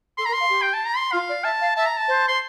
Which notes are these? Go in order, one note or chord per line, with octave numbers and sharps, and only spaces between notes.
A4 C6
A#5
A#4
C6
F5
G4
G5
A5
A#5
C6
F4 F5
D5
E5 A5
F5
E5 A5
A#5
A5
C5
C6